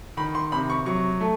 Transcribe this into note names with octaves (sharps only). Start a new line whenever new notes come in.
D#3 B5
C6
C3 B5
C#6
F#3 C#6
A3